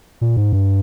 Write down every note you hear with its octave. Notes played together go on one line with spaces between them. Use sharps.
A#2
G#2
G2